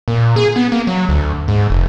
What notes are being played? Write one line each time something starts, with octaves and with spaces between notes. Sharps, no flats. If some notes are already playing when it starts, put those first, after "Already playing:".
A#2
G#4
B3
A#3
F#3
D2
G#2
F1